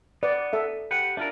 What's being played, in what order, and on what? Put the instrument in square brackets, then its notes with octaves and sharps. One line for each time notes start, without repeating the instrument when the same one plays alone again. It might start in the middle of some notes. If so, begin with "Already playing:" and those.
[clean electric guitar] B3 [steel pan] B4 D5
[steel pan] A4 E5
[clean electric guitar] G4 B4 F#5
[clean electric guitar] D4 F4 A#4 [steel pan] E5